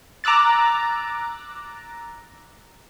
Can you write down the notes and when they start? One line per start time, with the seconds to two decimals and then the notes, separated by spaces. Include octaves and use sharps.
0.24 A#5 D6 E6 F#6 A6